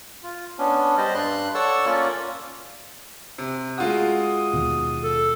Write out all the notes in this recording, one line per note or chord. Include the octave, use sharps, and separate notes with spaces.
F4
B3 C#4 D4
G3 G4 C5 D5 D#5
G2 G3 C6 F#6
A4 C#5 D5 F#5 C#6 E6
A#3 C#4 F4 D5
C3
G#3 F4 F#4 D#6
D#2 B2
A4